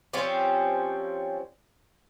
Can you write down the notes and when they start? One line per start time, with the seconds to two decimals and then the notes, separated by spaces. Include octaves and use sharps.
0.13 F3 G3 C4 C#4